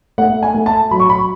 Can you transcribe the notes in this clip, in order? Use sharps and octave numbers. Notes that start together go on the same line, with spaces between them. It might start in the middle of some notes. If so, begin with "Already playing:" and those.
A3 F#5
G#5
A3
A5
F#3 B5
C#6
B5